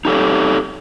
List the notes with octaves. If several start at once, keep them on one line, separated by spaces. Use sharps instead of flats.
D#4 G4 A4 C#5